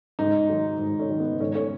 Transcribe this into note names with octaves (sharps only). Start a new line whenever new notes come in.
G#2 D#4
D#3 F#3
G#2
C#4
D#3 F#3
B3
G#2 C#4
C#4